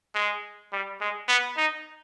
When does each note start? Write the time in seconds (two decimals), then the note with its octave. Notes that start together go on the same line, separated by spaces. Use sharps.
0.15 G#3
0.72 G3
1.01 G#3
1.28 B3
1.57 D#4